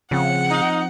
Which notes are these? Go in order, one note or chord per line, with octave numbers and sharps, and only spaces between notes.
C#3 F3 C4 F#5
D#4